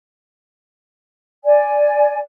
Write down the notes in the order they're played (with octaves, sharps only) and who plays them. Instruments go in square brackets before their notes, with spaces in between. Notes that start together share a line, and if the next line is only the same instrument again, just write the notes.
[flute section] D5 G#5